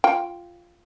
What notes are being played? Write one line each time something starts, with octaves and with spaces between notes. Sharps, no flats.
F4 G5